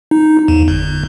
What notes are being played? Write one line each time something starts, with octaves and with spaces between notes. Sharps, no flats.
D#4
E2
G1